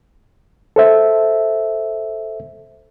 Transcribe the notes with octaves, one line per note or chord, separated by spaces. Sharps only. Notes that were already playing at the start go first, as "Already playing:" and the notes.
A4 C5 E5